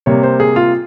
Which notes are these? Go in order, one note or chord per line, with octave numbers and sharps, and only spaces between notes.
C3 G3 A#3 C#5
C5
G#4
F4